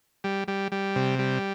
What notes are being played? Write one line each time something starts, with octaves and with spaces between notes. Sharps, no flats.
G3
G3
G3
C3
G3